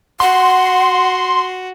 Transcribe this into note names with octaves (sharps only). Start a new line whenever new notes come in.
F#4 F#5 C6